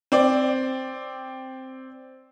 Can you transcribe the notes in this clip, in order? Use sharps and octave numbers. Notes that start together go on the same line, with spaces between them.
C4 D5